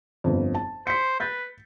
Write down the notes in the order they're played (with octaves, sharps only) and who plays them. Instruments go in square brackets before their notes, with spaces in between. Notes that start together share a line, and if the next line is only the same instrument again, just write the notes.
[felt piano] G1 F2
A5
[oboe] C5 [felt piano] B6 C#7
[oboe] B4 [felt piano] G6 A6